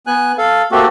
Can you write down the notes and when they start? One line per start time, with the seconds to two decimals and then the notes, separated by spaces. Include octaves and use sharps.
0.07 B3 G#5 F#6
0.38 A4 F5
0.72 A3 A#3 C4 F#4 G4 A4